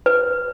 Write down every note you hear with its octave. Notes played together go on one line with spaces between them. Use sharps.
B4